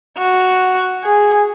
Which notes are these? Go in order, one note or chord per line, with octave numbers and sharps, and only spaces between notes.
F#4
G#4